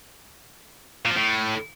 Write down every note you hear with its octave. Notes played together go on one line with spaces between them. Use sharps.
A#2
F3
A2